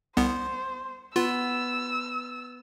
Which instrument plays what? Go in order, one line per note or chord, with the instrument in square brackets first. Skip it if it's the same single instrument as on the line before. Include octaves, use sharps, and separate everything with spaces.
[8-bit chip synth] C2 B3 [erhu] C5
[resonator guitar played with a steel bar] B3 [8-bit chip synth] F4 [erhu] E6